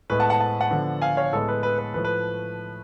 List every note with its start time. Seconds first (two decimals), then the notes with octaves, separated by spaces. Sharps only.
0.10 A2 G#3 B3 B4
0.20 F#5 A5
0.30 F#5 A5
0.40 F#5 A5
0.61 F#5 A5
0.71 D3 F3 B3
1.02 F5 G#5
1.17 C#5 F5
1.33 A2 G#3 B3 A4
1.48 B4
1.63 B4
1.79 B4
1.94 A2 F3 A3 B4
2.04 B4